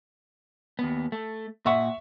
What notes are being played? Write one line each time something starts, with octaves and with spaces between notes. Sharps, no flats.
D#2 B3
A3
A#2 E5 F#5 C#6